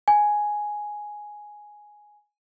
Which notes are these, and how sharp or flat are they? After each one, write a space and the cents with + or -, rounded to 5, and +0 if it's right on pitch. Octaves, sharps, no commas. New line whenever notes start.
G#5 +5